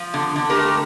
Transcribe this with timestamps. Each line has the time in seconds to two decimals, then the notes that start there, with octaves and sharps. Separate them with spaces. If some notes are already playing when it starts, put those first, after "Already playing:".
Already playing: F3
0.14 D3
0.36 D3
0.50 G4 A#4
0.57 A3